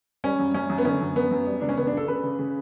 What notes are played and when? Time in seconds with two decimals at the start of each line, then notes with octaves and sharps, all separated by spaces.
0.24 G3 C#4
0.39 F#2
0.54 F#2 C#4
0.70 F#2
0.78 B3
0.85 D3 C#4
1.00 F#2
1.16 F#2 B3
1.31 F#2
1.47 G3
1.61 C#2 D4
1.69 C#4
1.77 C#2 B3
1.87 D4
1.92 C#3 A4
2.08 C#3 B4
2.23 C#3
2.39 C#3